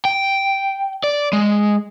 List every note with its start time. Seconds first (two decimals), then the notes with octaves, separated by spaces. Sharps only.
0.05 G5
1.04 D5
1.33 G#3